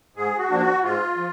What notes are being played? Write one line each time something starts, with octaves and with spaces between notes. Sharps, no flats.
G#2 G#4
F#4
F3 A#3 D4
F#4
G#2 F4
F3